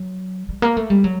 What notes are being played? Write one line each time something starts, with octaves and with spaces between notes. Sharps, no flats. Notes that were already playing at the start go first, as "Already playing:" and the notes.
Already playing: F#3
G3
A#3
A3
G3
F#3